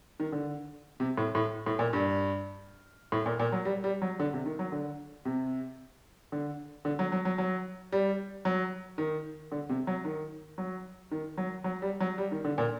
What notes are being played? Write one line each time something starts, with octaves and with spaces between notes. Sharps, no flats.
D#3
D3
C3
A2
A2
A2
A#2
G2
A2
A#2
A#2
F#3
G3
G3
F#3
D3
C3
D#3
F#3
D3
C3
D3
D3
F#3
F#3
F#3
F#3
G3
F#3
D#3
D3
C3
F#3
D#3
F#3
D#3
F#3
F#3
G3
F#3
G3
D#3
D3
A#2